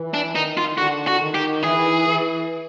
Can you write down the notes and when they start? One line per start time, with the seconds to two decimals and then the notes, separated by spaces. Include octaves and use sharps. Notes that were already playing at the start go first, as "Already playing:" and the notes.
Already playing: E3
0.14 D4
0.35 D#3 D#4
0.57 F4
0.77 D3 F#4
1.07 F#4
1.21 D#3
1.34 G4
1.64 E3 G#4
2.06 E3